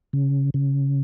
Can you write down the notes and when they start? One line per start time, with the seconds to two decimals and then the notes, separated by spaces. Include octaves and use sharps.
0.13 C#3
0.54 C#3